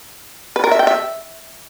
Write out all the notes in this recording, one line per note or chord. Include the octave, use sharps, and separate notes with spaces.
B4
A#4
E5
G5
E5